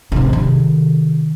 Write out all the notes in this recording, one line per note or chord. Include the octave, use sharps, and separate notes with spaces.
G#1 C3
C3 D#3